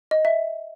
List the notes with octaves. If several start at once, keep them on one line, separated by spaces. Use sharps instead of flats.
D#5
E5